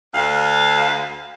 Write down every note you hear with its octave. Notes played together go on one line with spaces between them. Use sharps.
D2 F5